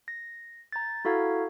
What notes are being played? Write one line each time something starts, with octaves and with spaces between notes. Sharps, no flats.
A#6
A#5 G6 A6
E4 F#4 A4 F5 A#5 G#6